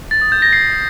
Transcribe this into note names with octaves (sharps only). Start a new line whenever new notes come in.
A6
D#6
G6
A#6
C7